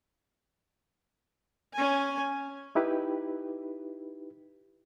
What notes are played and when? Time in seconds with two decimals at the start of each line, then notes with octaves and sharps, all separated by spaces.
1.73 C#4 G#5
2.75 D#4 E4 G4 B4